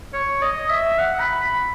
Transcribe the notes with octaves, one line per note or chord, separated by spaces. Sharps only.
C#5
D#5
E5
F#5
B5
B5